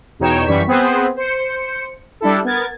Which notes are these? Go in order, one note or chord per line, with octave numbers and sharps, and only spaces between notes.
E2 B2 D#4 C#5 G5 E7
F#2 E3 G3 C#6 B6
B3 C4 G#4 B4 C5
C5 C#7
G3 D4 E4 A4
B3 A#4 G#6 A6